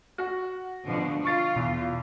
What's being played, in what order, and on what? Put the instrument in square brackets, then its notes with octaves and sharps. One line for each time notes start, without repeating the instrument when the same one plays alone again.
[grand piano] F#4 F#5
[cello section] B2 D3 F3
[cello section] F4 [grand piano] C#6 A6
[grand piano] E2 [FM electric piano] B2